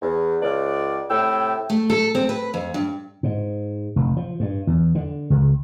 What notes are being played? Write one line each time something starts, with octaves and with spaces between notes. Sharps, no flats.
E2
C#2 D5
A2 C3 A3 E4 G5 E6
A3
A4
C4
B4
F2
G2
G#2
F1
F3
G2
E2
D3
C#2